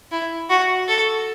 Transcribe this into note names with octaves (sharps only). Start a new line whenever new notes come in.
E4
F#4
A4